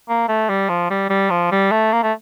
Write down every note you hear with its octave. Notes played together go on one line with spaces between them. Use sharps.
A#3
A3
G3
F3
G3
G3
F3
G3
A3
A#3
A3